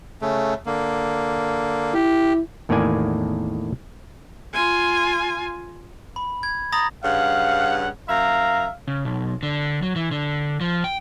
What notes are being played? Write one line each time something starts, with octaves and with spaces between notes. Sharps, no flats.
C#3 A3
D3 A#3
E4 G4
E2 A2 D#3 A#3 D5 G#5
F4 G#5
B5
G#6
A#5 B5 D#6 A6 A#6
G2 C#3 F5 F#5
F#2 E5 F5 A#5
C#3
B1
D3
F#3
E3
D3
F3
G5